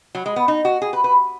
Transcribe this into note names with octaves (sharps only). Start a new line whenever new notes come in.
F#3
G#3
B3
D#4
F#4
G#4
B4
B4